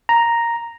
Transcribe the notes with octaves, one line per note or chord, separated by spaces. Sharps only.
A#5